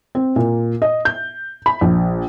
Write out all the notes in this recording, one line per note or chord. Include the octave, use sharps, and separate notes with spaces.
C4
A#2
D#5
G6
B5
A#1